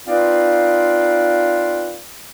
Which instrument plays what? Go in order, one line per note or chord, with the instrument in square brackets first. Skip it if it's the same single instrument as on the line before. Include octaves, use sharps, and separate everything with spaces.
[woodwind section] C4 D#4 F4 B4 D5 F5